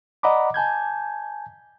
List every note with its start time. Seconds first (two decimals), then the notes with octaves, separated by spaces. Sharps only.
0.23 D5 D#5 F#5 A#5 B5 D6
0.54 G#5 A5 G6 G#6